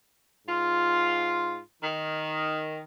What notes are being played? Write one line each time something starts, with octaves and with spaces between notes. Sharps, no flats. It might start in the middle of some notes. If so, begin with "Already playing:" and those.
G#2 F4
D#3